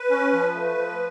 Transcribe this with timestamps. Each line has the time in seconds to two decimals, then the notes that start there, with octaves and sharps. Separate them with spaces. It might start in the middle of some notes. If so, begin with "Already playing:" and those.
Already playing: B4
0.10 C#4
0.32 F3
0.55 A3
0.76 F3